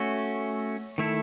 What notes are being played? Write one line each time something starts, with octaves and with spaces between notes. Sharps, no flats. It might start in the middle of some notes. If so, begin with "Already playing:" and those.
Already playing: A3 C#4 F#4
D#3 A3 E4 A4